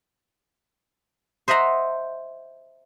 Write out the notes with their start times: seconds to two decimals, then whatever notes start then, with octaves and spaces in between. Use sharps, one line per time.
1.48 C5 D#5 E5 F#5 A#5